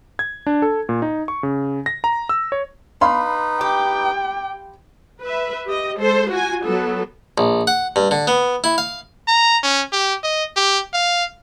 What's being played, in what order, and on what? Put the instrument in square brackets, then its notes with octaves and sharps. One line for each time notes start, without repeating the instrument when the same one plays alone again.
[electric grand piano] G#6
D4
A4
A#2
D#4
C#6
C#3
A#6
A#5
E6
C#5
[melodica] D#4 B4 [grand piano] F5 B5 C6
[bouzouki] G4 [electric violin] G5
[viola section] B4 E5
G4 D#5
G#3 A4 C5
F4 F#4 G#5
F#3 B3 A4
[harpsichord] A#1
F#5
G2
D3
B3
E4
F5
[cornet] A#5
C#4
G4
D#5
G4
F5